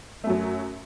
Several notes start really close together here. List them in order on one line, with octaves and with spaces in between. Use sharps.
A3 F#2 F#3